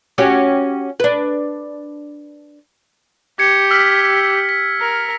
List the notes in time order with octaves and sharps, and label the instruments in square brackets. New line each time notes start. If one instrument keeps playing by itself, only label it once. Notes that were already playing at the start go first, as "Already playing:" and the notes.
[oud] C#4 F#4 G4
D4 B4
[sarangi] G4 [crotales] G#6 C#7
[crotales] E6 F6 B6
B6
[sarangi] A#4